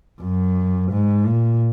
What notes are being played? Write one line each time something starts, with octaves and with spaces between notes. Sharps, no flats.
F#2
G#2
A#2